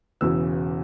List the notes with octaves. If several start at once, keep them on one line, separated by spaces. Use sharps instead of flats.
E1 E2 C#3 E3 E6